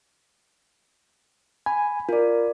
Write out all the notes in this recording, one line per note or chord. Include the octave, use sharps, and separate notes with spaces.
G#5 B5
F4 A#4 D5